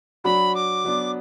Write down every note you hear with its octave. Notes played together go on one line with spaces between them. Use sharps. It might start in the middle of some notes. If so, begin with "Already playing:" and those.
F#3 D4 F#4 B5
D6
F#3 B3 D4